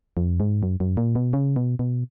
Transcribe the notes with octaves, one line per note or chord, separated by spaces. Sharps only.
F2
G#2
F#2
F#2
A#2
B2
C#3
B2
B2